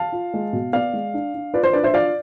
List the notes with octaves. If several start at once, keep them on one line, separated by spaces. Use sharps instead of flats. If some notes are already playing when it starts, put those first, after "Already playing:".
Already playing: F5 A5
F4
G#3
B2
B3 D5 F5
G#3
D4
D4
F4 B4 D5
C5
D4 B4 D5
C5 E5
F4 D5 F5